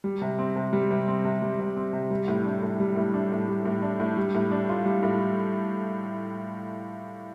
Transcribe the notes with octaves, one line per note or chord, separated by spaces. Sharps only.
G3
C3
C4
C3
G3
C3
C4
C3
G3
C3
C4
C3
G3
A2
D4
A2
G3
A2
D4
A2
G3
A2
D4
A2
G3
A2
D4
F4
G3
A2